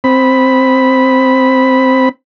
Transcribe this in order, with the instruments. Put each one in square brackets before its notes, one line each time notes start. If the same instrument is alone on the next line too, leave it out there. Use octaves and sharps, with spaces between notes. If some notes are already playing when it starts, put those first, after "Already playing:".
[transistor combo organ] C4 B5